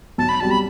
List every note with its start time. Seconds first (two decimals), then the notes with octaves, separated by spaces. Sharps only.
0.18 B1 A5
0.29 B5
0.40 B2 G3 C4 F#4 A5
0.51 B5